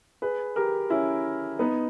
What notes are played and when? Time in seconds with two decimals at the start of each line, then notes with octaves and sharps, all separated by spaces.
0.22 G#4 B4
0.56 G4 A#4
0.90 C#4 E4
1.59 B3 D#4